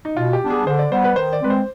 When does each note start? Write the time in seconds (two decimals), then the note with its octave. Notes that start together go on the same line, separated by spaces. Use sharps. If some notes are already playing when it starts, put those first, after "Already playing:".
0.05 D#4
0.16 B2 F4
0.33 G4
0.42 G3 B3 D4
0.50 G#4
0.66 D3 C5
0.79 D5
0.91 G3 B3 C5
1.04 B4
1.16 D#3 C5
1.33 D5
1.41 G#3 C4 B4
1.50 C5